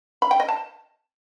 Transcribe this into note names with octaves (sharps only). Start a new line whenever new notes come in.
B5
G5
D#5
A5